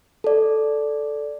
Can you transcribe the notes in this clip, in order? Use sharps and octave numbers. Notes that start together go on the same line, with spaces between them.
A4 D5